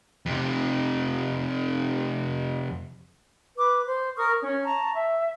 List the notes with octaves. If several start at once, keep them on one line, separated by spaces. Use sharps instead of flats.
F2 C3
B4 D6
C5
A#4 C#6 D#6 F6
C#4 C#5
A5 A#5 C#6
E5